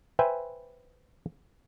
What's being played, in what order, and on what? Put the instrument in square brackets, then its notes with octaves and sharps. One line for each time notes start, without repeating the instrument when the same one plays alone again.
[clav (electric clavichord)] B4 C5 E5 G5 G#5